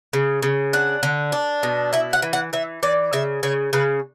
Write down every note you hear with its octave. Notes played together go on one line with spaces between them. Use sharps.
C#3
C#3
D4 F#5
D3
D4
B2
E4 E5
F#5
E3
F#5
E3 E5
E3 D5
C#3 E5
C#3 C#5
C#3 B4